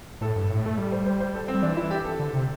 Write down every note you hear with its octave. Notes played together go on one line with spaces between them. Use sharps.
A2 A4
G2
A2
A3
G3 A4
C5
C5
C5
A4
C4
G3
E3 D4
E4
G4
A4
D3
C3